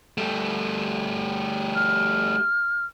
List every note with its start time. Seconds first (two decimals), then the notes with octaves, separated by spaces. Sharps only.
0.18 G3 A3
1.75 F6